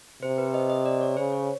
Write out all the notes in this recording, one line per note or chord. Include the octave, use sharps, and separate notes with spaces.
C3 C5
B4
D#5
D#5
D5
C#5
C#3 C5
C#5